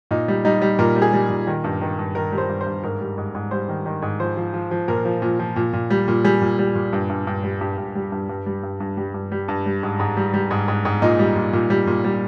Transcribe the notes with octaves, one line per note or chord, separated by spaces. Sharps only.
A#2 D#4
G3
G3 D#4
G3
A#2 A#4
G3
G#4
G3
A#2
D#3
G2
D#3
G2
D#3 A#4
G3
C5
G2
C5
G2
G#2 A#4
G3
G#2
G#2
G3 C5
D#3
D#3
G#2
F3 C5
F3
F3
F3
A#2 A#4
F3
A#2
F3
A#2
A#2
G3
A#2
G3 G#4
A#2
G3
A#2
G2
G2
G2
G3
G2 G4
G2
G3
G2
G2
G3
G2
G2
G3 G4
G2
G3
G2
G3
G#2
G#2
G3
G3
G#2
G#2
G#2
A#2 D#4
G3
A#2
A#2
G3
A#2
G3